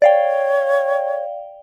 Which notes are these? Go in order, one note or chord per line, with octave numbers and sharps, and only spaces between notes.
C#5 D5 F5 G5